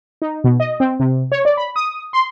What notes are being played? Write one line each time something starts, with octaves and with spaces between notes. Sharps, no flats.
D#4
B2
D#5
C4
C3
C#5
D5
B5
D#6
C6